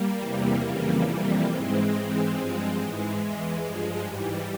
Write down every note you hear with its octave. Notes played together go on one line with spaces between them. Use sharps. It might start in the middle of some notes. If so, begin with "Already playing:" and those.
Already playing: G3 A#3
E2 C3 E3
F2 C#3 E3
F2 C3 E3 G3 A#3
G#2 E3 G#3 C4
G#2 E3
G2 F3
G#2 E3 G#3
E2 E3
G2 F3 G#3
G#2 E3 G3